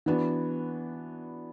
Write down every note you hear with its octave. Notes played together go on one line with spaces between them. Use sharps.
E3 B3 D4 F#4